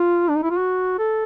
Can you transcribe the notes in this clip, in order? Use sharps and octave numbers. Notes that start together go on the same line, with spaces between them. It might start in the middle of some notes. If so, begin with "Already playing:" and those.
Already playing: F4
D4
D#4
E4
F4
F#4
A4